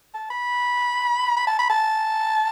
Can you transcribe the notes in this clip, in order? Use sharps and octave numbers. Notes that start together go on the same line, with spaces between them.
A5
B5
B5
A5
B5
A5